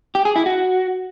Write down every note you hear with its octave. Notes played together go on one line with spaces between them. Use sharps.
G4
G#4
E4
F#4